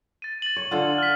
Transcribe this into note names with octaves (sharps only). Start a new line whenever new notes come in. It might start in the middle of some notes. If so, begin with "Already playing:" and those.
A6 D#7
A6 F#7
C#5
D3 F4 A4
F6 B6